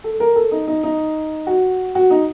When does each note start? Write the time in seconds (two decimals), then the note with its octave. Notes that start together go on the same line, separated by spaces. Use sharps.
0.04 A4
0.20 A#4
0.36 A4
0.51 D#4
0.67 D#4
0.83 D#4
1.47 F#4
1.95 F#4
2.10 D#4